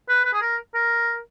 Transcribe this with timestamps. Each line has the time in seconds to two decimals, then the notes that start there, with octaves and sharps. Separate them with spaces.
0.09 B4
0.25 B4
0.33 G#4
0.42 A#4
0.74 A#4